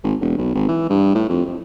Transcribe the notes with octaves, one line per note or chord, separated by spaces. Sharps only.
G#1
E1
B1
G#1
E3
G2
A2
F2
F2